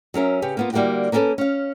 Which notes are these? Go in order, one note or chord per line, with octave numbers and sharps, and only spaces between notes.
F#3 C#4 A#4 E5
C#3 C#4 G4 B4
A#3 B3 F4
D3 G3 A#3 E4 F#4 G4
A#3 B3 C#4 G#4 A4 B4
C#4 F5